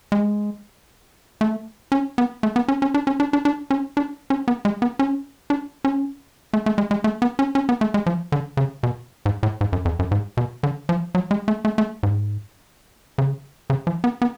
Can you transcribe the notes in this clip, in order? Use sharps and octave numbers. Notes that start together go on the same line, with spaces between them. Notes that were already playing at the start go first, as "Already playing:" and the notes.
G#3
A3
C#4
B3
A3
B3
C#4
C#4
D4
C#4
D4
D4
D4
C#4
D4
C#4
B3
G#3
B3
C#4
D4
C#4
A3
A3
G#3
G#3
A3
B3
C#4
C#4
B3
A3
G#3
F3
D3
C#3
B2
G#2
A2
G#2
F#2
F2
F#2
G#2
B2
D3
F3
F#3
G#3
A3
A3
A3
G#2
C#3
C#3
F3
B3
B3